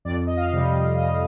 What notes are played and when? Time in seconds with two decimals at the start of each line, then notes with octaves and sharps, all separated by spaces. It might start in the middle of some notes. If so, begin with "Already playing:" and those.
0.05 F2 D5
0.27 D#5
0.37 F5
0.52 C3 G3
0.67 D#5
0.97 F2 D#5